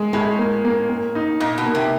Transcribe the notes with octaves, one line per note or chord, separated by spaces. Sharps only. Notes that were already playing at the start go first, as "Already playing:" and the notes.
Already playing: G#3
A2 G#3
A#3
A#3
A#3
D#4
A#2 D#4
B2
A#3
C3